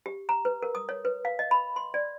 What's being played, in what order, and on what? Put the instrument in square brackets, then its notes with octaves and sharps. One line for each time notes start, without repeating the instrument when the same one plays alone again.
[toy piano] G4
A#5
B4
A#4
D#6
C#5
B4
F5
D#5
B5
C6
D5